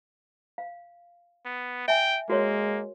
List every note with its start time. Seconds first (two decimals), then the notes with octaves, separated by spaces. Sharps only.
0.58 F5
1.46 B3
1.88 E5 G5 G#5
2.30 G#3 A#3 F#4 A#4 C#5